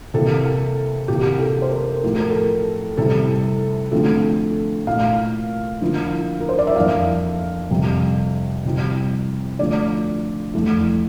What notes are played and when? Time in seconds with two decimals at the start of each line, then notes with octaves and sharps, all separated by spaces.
0.14 C3 E3 A#3 E4 A4
1.08 C3 E3 A#3 G4
1.40 A4
1.62 C5
1.71 A#4
2.04 A2 F3 A3 E4 A4
2.16 A#4
2.30 A4
2.98 C3 G3 C4 E4 A4
3.92 D3 F3 A3 C4 A4
4.87 A#2 A3 E4 F5
5.81 D3 F3 A#3 E4
6.40 A#4
6.49 C5
6.58 D5
6.67 E5
6.76 F2 E3 A#3 D4 F5
7.71 F2 C3 G3
8.65 C3 G3 C4 E4
9.59 D3 F3 A3 D5
10.54 F2 E3 A3 E4